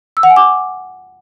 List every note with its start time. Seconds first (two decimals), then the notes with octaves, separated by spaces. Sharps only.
0.17 E6
0.23 F#5
0.30 G#5
0.36 D6